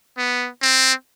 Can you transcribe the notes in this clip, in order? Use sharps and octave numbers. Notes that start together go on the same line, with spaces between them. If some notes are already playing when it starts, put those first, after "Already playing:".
B3
C4